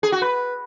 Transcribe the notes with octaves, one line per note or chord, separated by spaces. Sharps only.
G#4
F#4
B4